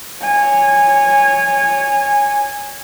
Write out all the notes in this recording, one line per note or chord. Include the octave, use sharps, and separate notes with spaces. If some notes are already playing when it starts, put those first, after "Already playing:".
C#5 G#5